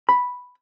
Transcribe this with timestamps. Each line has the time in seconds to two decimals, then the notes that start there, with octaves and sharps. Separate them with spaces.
0.09 B5